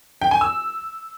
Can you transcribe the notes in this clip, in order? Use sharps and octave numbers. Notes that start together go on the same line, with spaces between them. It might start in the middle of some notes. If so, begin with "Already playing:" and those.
G5
G#5
E6